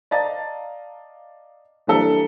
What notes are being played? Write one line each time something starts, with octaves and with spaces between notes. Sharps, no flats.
D5 D#5 F5 A5 A#5 A6
F#1 E3 G3 D4 A4 A#5